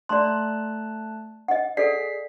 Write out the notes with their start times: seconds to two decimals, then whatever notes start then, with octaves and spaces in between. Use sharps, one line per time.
0.09 A3 D5 A5 C6 F#6
1.48 D#5 F#5
1.77 G#4 A4 D5 B6 C7